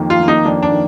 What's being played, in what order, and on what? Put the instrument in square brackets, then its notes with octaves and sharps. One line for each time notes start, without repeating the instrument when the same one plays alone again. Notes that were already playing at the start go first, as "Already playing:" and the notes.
Already playing: [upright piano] F2 D#3 A#3
[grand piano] F4
[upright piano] D#3 A#3
[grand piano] D#4
[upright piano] F2 [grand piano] D4
[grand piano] D4
[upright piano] D#3